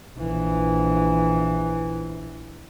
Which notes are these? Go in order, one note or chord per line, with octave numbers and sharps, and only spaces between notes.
A#1 E3